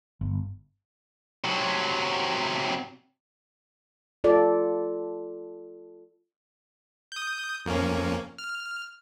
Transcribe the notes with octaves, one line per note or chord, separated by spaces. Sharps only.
G1
C3 F#3
F4 A4 D5
D#6 G6
F2 A#3 C#4
F6